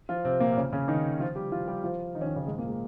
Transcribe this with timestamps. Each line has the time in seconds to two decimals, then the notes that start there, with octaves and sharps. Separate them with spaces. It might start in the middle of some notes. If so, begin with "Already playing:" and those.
0.09 F3 F4
0.24 C3 C4
0.40 A#2 A#3
0.57 C#3 C#4
0.73 C#3 C#4
0.88 D#3 D#4
1.20 F3 F4
1.36 G3 G4
1.52 F3 F4
1.68 G3 G4
1.84 F3 F4
2.15 D#3 D#4
2.21 C#4
2.26 D#3 D#4
2.36 C#3 C#4
2.47 G#2 G#3
2.58 A#2 A#3
2.68 G#3